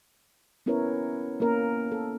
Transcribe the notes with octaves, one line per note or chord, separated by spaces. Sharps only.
B3 C#4 E4 A#4 B4 C#5
A#3 C#4 A#4
A4